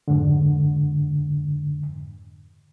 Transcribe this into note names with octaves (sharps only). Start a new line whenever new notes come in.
F2 G#2 D3